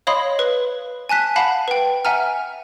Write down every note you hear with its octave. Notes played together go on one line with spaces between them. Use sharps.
C#5 D#5 F5 B5 C6 D#6
B4
G#5 A5 F#6 B6
F5 F#5 A5 B5
B4 G5
E5 F#5 G#5 A#5 F6